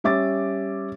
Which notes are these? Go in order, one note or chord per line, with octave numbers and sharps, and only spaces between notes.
G3 C#4 E5 D6 A6